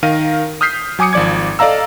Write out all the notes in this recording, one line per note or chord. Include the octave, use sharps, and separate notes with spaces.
D#3 A#4 F5 D#7
D#6 F6 G6 B6 C7
F#3 G#5 D6 D#6 C#7
G#1 F3 D5 D6 G#6
A4 D5 D#5 F5 A#5 E6